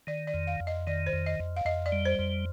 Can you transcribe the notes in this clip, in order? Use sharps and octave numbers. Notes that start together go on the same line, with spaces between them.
D#3 D5
D5
F2
F5
F2
D#5
D#3 D5
C5
F2
D#5
F2
F5
F2 D#5
D5
G3
C5
F2